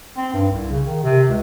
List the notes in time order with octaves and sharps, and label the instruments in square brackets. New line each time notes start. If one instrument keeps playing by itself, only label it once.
[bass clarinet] C4
G2
C2
C#3
D#3
C3
C#2